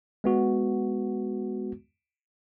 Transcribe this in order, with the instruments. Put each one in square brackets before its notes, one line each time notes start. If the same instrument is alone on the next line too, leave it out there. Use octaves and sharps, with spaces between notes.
[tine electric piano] G#3 B3 F#4